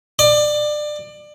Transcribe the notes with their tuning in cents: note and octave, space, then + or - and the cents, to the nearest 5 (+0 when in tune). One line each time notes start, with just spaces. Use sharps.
D5 +25